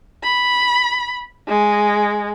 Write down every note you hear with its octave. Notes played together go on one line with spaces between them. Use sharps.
B5
G#3